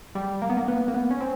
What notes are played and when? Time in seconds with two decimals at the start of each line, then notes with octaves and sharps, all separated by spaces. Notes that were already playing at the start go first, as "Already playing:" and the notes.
0.15 G3
0.42 A#3
0.49 B3
0.57 A#3
0.68 B3
0.88 A#3
0.94 B3
1.11 C#4
1.20 C4